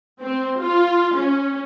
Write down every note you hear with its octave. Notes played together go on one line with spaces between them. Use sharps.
C4
F4
C#4